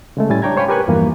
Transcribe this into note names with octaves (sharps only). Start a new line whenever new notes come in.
C#3 G#3 A3
A2 G3 C#4 E4 G#5 A6
D4 C#5 G5 A#5 G#6
C5 C#5 F5 G5 G#5 B5
G4 A#4 B4 G#5 C#6 F#6
E2 G2 E3 F3 A#3